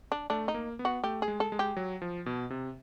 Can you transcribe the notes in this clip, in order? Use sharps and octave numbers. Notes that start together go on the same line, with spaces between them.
D4
A3 D4
D#4
A#3
B3
F#4
A3 G4
G#4
G#3
A4
G#3
G4
F#3
F3
B2
C3